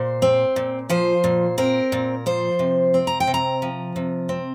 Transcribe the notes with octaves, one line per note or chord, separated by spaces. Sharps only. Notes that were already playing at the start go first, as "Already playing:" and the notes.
Already playing: A#2 C5
C4
A#2
F3 C5
A#2
C4 A#4
A#2
F3 C5
C3
C4
A#5
G5
C3
A#5
F3
C3
C4